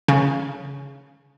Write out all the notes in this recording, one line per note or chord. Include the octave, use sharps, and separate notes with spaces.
C#3